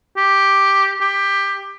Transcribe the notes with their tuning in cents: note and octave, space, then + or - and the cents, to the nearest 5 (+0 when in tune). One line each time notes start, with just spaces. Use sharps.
G4 +0
G4 +15